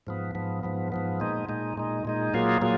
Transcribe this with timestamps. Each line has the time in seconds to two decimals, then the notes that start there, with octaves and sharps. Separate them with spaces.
0.07 G#2 F3 B3
0.35 G#2 F3 B3
0.63 G#2 F3 B3
0.92 G#2 F3 B3
1.20 A#2 G#3 D#4
1.49 A#2 G#3 D#4
1.77 A#2 G#3 D#4
2.05 A#2 G#3 D#4
2.34 A#2 F#3 A#3 F4 G#4
2.61 A#2 F#3 A#3 F4 G#4